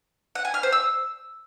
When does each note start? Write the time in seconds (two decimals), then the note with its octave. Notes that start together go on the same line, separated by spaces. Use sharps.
0.35 F#5
0.45 G#5
0.54 F6
0.63 C5
0.72 E6